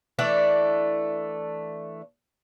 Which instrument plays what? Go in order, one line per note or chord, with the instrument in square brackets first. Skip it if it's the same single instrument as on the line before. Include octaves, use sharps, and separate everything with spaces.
[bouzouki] E3 A3 D4 D5